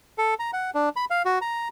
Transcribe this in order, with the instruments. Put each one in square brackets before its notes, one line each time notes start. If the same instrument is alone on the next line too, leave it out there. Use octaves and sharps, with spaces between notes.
[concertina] A4
A#5
F#5
D4
B5
F5
F#4
A#5